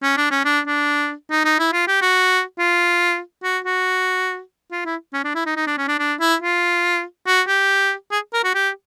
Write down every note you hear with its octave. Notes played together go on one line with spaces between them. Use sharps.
C#4
D4
C#4
D4
D4
D#4
D#4
E4
F4
G4
F#4
F4
F#4
F#4
F4
E4
C#4
D4
E4
D#4
D#4
D4
C#4
D4
D4
E4
F4
F#4
G4
G#4
A#4
F#4
G4